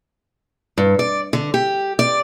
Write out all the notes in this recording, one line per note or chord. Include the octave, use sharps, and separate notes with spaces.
G2
D5
D3
G4
D5